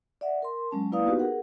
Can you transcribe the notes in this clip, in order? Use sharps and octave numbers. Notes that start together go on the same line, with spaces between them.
D5 E5 F#5
A#4 C6
F#3 G#3 C#4 A5
A#3 E4 B4 D5 F5 D#6
B3 D#4 F#4 G4 B4
G#4 A#4 F#5